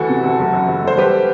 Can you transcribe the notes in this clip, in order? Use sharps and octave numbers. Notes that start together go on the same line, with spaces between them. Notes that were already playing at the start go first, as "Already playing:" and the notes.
Already playing: D2 E3 F#4 A4
C3
D2
F#1
F#2
F#1
F#1 C5
G3 G4 B4